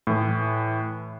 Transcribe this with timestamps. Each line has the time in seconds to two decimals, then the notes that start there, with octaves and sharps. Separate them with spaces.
0.07 A2 E3